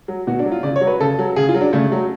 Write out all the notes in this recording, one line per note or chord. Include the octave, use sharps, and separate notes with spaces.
F#3
B2 F#4
D4
F#3
F4
C#3 D5
C#5
F#3
B4
C#3 A4
F#3
C#3 G#4
F4
F#3
D4
C#3 A3
F#3